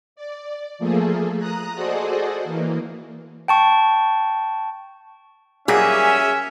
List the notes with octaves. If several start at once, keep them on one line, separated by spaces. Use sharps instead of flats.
D5
F3 A3 A#3 G#4 A4
A#5 D#6 F#6
F#4 G#4 A4 C5 D5 D#5
E3 A#3
G5 A5 C#6
F#3 G3 A#3 C#4 G#4 E5